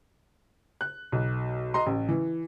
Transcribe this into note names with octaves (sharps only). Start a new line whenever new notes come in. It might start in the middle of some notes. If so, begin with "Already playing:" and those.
F#6
B1
D#5 A#5 C6
A1
E3